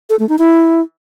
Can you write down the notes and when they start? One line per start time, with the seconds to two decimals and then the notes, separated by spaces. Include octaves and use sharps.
0.10 A4
0.19 A3
0.29 D#4
0.39 E4